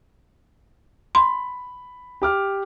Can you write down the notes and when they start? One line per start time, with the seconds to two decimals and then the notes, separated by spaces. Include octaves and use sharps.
1.15 B5 C6
2.22 G4 D6 F6